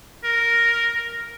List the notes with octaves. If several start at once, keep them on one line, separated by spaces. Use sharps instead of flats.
A#4